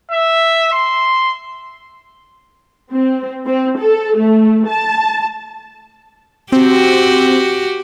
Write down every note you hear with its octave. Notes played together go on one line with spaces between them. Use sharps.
E5
C6
C4
C4
A4
A3
A5
C4 F#4 G4